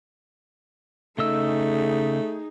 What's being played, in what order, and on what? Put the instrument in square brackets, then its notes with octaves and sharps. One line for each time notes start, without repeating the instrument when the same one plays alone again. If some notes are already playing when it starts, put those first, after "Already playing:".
[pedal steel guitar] C#3 D#5 E6 [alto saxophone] A3 [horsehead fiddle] D#4 G#4